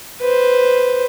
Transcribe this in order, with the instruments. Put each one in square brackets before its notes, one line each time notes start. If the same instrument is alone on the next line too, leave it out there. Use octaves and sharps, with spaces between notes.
[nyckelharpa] B4 C5